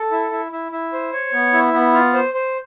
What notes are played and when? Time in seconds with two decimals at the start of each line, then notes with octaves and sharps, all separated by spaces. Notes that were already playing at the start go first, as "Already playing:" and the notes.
Already playing: A4
0.11 E4
0.31 E4
0.52 E4
0.72 E4
0.93 C5
1.13 C#5
1.33 B3
1.53 E4
1.73 B3
1.93 F4
2.14 C5
2.34 C5